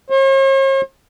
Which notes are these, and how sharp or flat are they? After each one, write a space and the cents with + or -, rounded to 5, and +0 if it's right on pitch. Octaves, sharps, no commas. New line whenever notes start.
C#5 -45